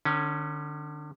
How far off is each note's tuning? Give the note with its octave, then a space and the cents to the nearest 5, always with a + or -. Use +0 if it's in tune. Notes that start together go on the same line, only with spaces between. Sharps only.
D3 +35 C#4 +0